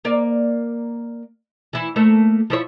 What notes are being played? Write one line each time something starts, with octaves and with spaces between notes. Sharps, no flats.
A#3 D5
E3 E4
A3 A#3 A4
F3 E4 C#5